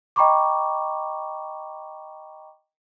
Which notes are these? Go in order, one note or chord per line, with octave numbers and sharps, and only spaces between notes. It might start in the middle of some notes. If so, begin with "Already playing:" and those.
D#5 G5 A#5 B5 C#6 D6